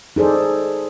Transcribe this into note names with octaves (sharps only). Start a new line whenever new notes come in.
D#4 G#4 A4 C5 D5